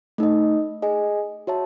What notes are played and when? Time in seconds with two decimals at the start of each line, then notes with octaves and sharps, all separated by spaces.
0.18 A3 D#4 A4 D#5
0.82 G#4 D#5 G#5
1.47 F#4 C#5 E5 A5